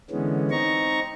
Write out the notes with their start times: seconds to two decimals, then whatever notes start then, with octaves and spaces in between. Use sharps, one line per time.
0.11 D3 E3 G#3 B3 C#4
0.51 C4 D#4 A#5 C#6